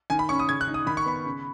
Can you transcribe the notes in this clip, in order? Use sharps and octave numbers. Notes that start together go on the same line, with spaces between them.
D#3 G#5
B5
C#4 C#6
D#6
C#3 G#6
F#6
D#4
D#6
D#3 B5
C#6
B3 B5
C#3